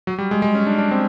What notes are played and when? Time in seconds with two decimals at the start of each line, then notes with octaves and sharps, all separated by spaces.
0.07 F#3
0.18 G3
0.31 G#3
0.42 G#3
0.55 C#4
0.67 D4
0.78 D4
0.91 C4